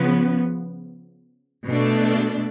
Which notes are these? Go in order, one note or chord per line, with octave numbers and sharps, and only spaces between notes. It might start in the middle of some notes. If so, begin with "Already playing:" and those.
Already playing: C#3 F3 B3
B2 A3 D4